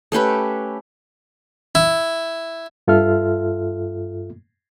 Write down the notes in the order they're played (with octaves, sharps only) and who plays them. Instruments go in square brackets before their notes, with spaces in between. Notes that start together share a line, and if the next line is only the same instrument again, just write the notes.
[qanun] A3 C#4 G4 B4
[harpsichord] E4
[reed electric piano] G2 F4 A4 E5 F6